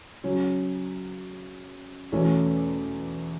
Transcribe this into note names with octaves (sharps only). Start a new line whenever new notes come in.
C#3 F#3 C#4
E2 B2 A3 C#4